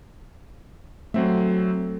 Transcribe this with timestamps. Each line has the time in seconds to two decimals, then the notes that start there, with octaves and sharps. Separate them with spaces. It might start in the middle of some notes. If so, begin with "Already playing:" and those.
1.14 F#3 A3 C4 E5